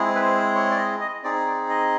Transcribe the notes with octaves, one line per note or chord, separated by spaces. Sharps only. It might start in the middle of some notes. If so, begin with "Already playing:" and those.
Already playing: G#3 C4 E4 G#4
B4
C5
C#5
D5
D#5
D#5
C4 D#4 G#4 D5
D5
D#5